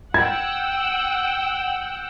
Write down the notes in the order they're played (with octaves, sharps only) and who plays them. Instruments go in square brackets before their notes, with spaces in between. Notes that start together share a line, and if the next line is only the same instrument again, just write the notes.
[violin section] F#5 G5 E6 [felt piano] G#6